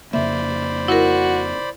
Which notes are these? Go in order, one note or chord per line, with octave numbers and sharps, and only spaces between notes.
F2 C#3 A#3 C5 D5 E5 B5
E4 F#4 A#4